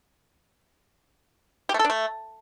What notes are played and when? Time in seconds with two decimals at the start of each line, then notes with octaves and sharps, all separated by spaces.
1.69 G4
1.74 A3
1.79 A4
1.84 D4
1.90 A3